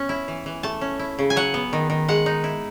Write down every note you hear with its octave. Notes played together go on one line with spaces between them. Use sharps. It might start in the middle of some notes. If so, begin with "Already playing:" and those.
Already playing: B3 C#4
E4
E3
E3
A3 A5
C#4
E4
C#3
G#5
F#3 F#5
B3
D#3
D#3
G#3 F#5
D#4
E4